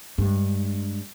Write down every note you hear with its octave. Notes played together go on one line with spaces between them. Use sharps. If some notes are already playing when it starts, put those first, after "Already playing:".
G2 G#3